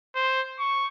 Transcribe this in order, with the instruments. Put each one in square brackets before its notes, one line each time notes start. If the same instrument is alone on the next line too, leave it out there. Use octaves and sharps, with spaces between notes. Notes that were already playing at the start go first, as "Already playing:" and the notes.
[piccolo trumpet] C5
C#6